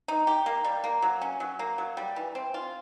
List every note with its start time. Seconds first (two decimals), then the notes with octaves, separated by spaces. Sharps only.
0.08 D#4
0.27 G4
0.46 A#3
0.64 G3
0.84 A#3
1.02 F#3
1.21 C#4
1.40 F#3
1.59 A#3
1.78 F#3
1.97 G3
2.16 E3
2.35 C4
2.54 F4